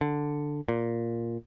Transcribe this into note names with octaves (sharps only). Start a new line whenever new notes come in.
D3
A#2